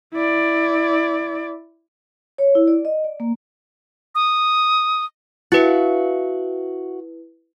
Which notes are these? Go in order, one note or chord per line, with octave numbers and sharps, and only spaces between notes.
E4 D5
C#5
E4
D5
D#5
D5
A#3
D#6
E4 F#4 B4 E5 F5